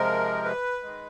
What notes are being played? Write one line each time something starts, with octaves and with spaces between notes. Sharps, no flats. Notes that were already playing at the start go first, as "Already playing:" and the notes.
Already playing: C3 F3 G#3 A#4
B4
D#3 G#3